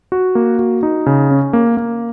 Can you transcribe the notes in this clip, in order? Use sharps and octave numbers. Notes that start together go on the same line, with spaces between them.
F#4
A#3
F#4
D#4
C#3
C#4
A#3
A#3